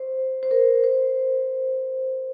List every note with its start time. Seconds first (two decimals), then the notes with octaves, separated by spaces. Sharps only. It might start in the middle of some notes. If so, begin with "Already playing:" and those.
Already playing: C5
0.43 C5
0.51 A#4
0.84 C5